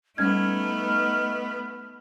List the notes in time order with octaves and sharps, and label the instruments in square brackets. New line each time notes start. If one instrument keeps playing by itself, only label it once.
[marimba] G3 C#4 G#6 [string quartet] A3 B3 [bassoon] D#4 [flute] F6